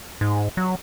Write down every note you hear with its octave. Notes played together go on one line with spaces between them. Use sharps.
G#2
F#3